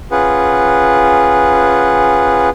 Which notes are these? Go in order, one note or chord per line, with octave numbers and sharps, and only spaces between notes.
C#4 F4 G#4 B4 F#5